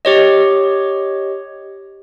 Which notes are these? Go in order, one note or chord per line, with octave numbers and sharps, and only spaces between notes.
G4 C#5 D#5